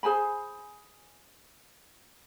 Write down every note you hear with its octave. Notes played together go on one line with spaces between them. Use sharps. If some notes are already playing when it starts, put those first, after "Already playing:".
G#4 C5 G#5 B5